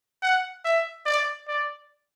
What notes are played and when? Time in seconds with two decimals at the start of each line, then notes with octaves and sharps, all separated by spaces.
0.23 F#5
0.65 E5
1.06 D5
1.48 D5